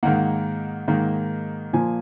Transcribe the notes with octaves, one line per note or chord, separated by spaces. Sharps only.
G#2 D#3 A#3 F#5
G#2 D#3 A#3
A#2 F3 A#3 G#5